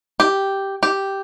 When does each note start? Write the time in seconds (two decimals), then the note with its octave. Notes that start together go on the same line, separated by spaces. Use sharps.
0.20 G4
0.83 G4